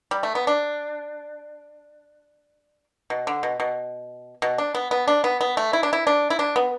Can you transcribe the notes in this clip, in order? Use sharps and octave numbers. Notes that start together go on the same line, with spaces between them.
G3
A3
B3
D4
B2
D3
B2
B2
B2
D4
B3
B3
D4
B3
B3
A3
E4
D4
E4
D4
E4
D4
B3